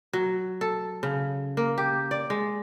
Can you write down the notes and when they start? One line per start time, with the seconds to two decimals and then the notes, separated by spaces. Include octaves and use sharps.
0.13 F#3
0.61 A4
1.03 C#3
1.57 A#3
1.78 G4
2.11 D5
2.30 G#3